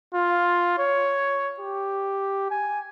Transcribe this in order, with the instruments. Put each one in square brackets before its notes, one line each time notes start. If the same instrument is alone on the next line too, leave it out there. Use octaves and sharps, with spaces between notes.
[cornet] F4
C#5
G4
G#5